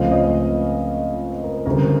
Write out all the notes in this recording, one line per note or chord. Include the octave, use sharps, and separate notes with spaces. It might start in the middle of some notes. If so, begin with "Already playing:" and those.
Already playing: C#2 C#3 F3 A3 C4 D#5 F5
C#5 D#5
A#4
D2 C#3 E3 G3 C4 A#4